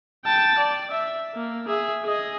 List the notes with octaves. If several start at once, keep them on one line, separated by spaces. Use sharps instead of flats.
G5 A5
D5
E5
A#3
G#4 E5
G#4 D#5